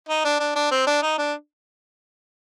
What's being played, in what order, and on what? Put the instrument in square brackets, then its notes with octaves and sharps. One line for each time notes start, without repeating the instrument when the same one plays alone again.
[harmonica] D#4
D4
D4
D4
C4
D4
D#4
D4